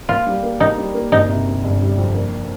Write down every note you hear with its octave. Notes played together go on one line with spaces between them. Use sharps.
A#3 F4
G3
A#3
A#3 D#4
G3
A#3
G1 D#4
C3
C3
G1
G3
F2
A#3